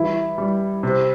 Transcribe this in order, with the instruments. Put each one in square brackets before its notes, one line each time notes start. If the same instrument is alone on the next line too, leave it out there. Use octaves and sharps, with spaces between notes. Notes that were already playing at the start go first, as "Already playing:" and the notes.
Already playing: [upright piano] E3 G3 [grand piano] E4
[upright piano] G3
C3